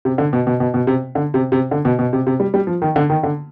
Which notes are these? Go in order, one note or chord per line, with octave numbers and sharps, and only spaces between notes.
C3
D3
B2
B2
B2
B2
C3
D3
C3
C3
D3
B2
B2
C3
C3
G3
G3
F3
D#3
D3
D#3
D3